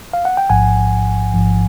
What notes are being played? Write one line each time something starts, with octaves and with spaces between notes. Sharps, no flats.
F5
F#5
G5
A1 G#2 F3 F#5 G#5
A1 G#2 F3